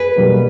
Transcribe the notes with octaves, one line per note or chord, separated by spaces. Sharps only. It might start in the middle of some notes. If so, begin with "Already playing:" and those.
Already playing: G#4 B4
B2 G3 A#3